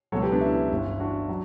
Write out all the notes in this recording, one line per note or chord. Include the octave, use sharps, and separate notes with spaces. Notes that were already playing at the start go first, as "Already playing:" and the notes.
C#2 B2 F#3 A4 C#5
G4 B4
B3 D4
C#4 E4
G1 G2 E3
D4 F#4
F#3